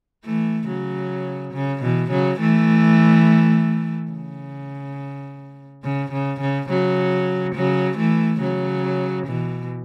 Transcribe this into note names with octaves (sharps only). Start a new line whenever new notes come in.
E3 A3
C#3 F#3
C#3
B2 E3
C#3 F#3
E3 A3
C#3
C#3
C#3
C#3
C#3 F#3
C#3 F#3
E3 A3
C#3 F#3
B2 E3